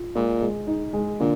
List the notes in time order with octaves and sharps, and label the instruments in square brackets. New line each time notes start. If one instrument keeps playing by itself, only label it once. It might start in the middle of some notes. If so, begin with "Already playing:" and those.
Already playing: [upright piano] F4
[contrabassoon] A#2 [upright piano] G#3
[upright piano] G#3
D#4
G#3
[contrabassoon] A#2 [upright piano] D3